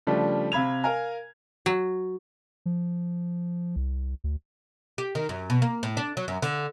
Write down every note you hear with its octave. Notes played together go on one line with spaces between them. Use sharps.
C#3 F3 G3 A3 D4
C3 F5 B5 G#6 F7
A#4 F5 G#5 A#5
F#3
F3
C2
D2
G4
D#3
F#2
B2
A#3
A2
D4
F#3
F#2
D3